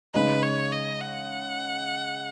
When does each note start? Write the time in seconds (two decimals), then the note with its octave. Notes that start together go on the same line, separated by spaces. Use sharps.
0.14 C#3 G#3 D#4 B4
0.43 C#5
0.72 D#5
1.01 F#5